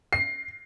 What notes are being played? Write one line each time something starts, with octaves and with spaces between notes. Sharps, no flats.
C7